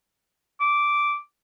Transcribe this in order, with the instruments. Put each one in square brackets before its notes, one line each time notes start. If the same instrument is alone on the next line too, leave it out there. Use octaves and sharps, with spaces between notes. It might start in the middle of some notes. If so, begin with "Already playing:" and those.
[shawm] D6